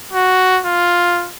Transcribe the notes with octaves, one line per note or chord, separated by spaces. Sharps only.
F#4
F4